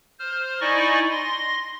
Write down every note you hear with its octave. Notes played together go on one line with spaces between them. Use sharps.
C5 F6
D#4 E4 D5 D#5 G#5 C#6
C6 A#6